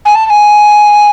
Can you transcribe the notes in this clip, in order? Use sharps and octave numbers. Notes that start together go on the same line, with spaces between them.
G#5
A5
A5
G#5